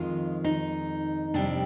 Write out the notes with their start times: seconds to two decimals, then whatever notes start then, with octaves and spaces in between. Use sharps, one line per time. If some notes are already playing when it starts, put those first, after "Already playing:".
Already playing: F2 D#3 G#3 F4
0.44 D#4
1.34 F2 C3 G3 D4